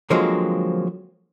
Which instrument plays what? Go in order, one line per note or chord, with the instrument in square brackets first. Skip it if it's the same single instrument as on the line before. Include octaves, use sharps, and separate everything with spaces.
[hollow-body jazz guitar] D3 F3 F#3 G#3 A#3 C4